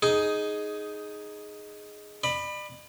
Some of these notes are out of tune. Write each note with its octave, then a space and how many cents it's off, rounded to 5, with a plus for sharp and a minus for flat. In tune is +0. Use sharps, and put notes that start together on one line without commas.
D#4 +0 G#4 +10
D5 +40 B5 +0